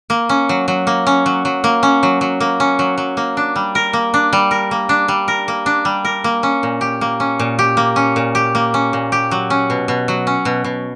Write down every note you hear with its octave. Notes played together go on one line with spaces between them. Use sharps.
A#3
C#4
F#3
F#3
A#3
C#4
F#3
F#3
A#3
C#4
F#3
F#3
A#3
C#4
F#3
F#3
A#3
D4
G3
A#4
A#3
D4
G3
A#4
A#3
D4
G3
A#4
A#3
D4
G3
A#4
A#3
C#4
A#2
G4
A#3
C#4
A#2
G4
A#3
C#4
A#2
G4
A#3
C#4
A#2
G4
F#3
C#4
B2
B2
F#3
C#4
B2
B2